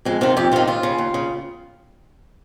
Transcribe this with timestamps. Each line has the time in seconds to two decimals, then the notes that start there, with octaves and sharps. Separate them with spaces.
0.05 F2 G#3
0.21 C3 D#3 F4
0.37 F2 G4
0.52 C3 D#3 F4
0.67 D#2 F4
0.83 C#3
0.98 D#2
1.14 C#3